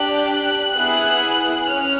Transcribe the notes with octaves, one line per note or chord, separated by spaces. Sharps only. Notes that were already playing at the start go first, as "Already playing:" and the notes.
Already playing: D4 G4 F#6
F#6
B3 E4 G#4
C#4 F6